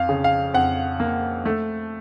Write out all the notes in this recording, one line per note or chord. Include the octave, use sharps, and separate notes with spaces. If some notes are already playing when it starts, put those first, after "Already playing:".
Already playing: F2 F5
C#3
F5
F2 F#5
A#3
A3